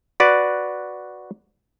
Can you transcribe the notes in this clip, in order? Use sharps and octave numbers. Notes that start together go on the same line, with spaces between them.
F#4 B4 D5